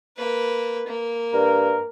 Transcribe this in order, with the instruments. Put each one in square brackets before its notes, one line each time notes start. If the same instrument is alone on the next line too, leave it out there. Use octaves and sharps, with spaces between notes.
[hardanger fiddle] A#3 B4
A#3
[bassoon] G2 [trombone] A#4